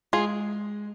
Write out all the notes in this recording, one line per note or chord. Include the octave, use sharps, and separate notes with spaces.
G#3 F4 G#4